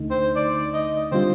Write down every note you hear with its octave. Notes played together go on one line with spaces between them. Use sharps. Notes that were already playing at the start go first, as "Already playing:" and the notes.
Already playing: D2 D3 A3 D#4
C5
D5
D#5
D3 G3 C4 F4 C5